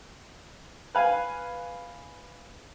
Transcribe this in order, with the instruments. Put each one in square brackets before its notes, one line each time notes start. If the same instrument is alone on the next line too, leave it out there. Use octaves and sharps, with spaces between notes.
[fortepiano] B4 F5 G#5